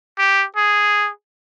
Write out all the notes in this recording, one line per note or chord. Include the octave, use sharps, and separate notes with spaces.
G4
G#4